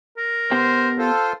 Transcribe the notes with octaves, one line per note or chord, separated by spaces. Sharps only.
A#4
B3 G4 C5 G5
F4 A4 C5